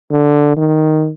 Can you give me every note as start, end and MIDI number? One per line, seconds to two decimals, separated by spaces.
0.11 0.55 50
0.57 1.11 51